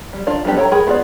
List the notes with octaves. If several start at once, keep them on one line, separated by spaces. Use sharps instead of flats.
G3
D4 F4 A#4 F5
G3 B3 D4 G4
A4 C#5 F#5 G5 A#5
G#3 G#4 A#4 G5 B5
B3 F4 G#4 D5